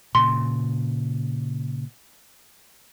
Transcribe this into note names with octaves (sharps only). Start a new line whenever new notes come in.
A#2 C#3 C6